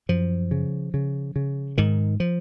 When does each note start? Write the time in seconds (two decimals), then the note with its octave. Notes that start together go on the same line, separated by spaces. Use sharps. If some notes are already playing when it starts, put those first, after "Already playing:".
0.09 F#2 F3
0.51 C#3
0.94 C#3
1.36 C#3
1.78 G#2 D#3
2.20 F3